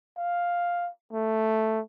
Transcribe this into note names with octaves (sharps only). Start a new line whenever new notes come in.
F5
A3